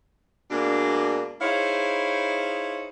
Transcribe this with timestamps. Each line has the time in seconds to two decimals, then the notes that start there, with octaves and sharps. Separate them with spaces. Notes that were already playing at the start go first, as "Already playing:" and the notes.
0.50 B2 G#3 A#3 D4
1.41 D#4 E4 G#4 C5 C#5 F5